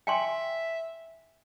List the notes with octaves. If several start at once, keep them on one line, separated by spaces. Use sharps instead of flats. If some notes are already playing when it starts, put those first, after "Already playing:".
E5 G5 G#5 C6